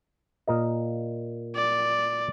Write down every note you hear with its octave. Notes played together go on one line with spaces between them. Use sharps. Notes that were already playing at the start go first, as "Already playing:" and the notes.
A#2 A#4 D#5
D5